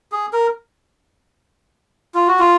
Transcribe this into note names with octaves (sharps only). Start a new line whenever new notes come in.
G#4
A#4
F4
F#4
F4